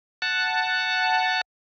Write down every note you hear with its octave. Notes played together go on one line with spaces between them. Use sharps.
F#5 A5